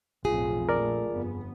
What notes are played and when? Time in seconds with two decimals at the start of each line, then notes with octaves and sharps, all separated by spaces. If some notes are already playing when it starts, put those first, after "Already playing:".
0.25 B1 F2 A2 F4 G#4
0.69 A#1 A3 A#4 D5
1.08 G1 F2 B3